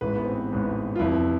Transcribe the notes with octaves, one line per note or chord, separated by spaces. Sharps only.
A1 G#2 E3 B4
B3
C4
A1 G#2 E3
F4
F1 F2 E3 E4